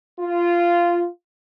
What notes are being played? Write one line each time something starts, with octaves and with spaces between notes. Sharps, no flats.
F4